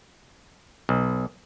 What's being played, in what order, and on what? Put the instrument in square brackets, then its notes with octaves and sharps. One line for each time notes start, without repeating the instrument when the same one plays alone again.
[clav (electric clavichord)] B1